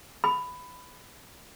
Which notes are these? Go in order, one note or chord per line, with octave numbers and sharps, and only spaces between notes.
B5